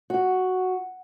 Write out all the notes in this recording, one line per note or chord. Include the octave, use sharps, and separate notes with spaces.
F#4